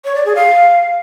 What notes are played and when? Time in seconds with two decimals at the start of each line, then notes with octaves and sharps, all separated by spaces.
0.05 C#5
0.15 D5
0.25 G#4
0.35 F5